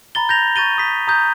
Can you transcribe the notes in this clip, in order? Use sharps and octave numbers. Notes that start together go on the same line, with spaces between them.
A#5 B5 A6 G7
G6 A6 A#6 F7
C#6 G6 A6 D#7 G7
D#6 B6
A#5 D#6 G6